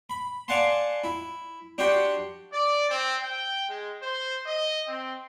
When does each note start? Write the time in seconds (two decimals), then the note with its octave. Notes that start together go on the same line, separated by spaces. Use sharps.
0.10 B5
0.48 D5 F5 F#5 G#5 A5 C6
1.04 E4
1.78 D4 F#4 G4 F#5 G5 C6
2.53 D5
2.90 C4
3.23 G5
3.70 G#3
4.03 C5
4.46 D#5
4.88 C4